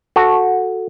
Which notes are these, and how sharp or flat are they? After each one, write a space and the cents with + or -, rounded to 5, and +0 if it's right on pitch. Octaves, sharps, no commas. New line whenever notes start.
F#4 -10 A4 +0